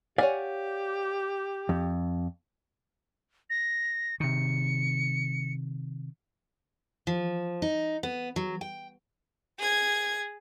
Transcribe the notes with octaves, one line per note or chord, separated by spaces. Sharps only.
G4 C#5 D5 F5 F#5 G#5
F2
A#6
C3 D#3 C#7
F3
D#4
B3
F#3
G5
G#4 G#6